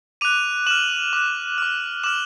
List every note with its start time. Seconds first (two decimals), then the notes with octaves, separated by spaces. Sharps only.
0.21 D6 F#6 D#7 F7
0.67 D6 F6 E7 F#7
1.13 D6 F#6
1.58 D6 F6
2.03 D6 F6 E7 F#7